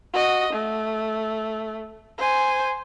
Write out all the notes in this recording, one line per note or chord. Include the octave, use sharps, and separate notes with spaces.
F#4 D#5
A3
C5 G#5